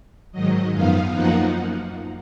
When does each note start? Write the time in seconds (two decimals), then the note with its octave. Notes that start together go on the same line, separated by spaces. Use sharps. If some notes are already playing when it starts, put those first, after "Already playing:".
0.32 G#2 D#3 F#3 D#5
0.73 F#2 F3 B3 D#4 F5
1.13 F#2 F3 A#3 D#4 F#5